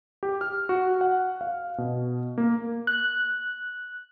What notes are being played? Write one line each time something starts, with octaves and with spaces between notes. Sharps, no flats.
G4
F6
F#4
F#5
F5
B2
A#3
F#6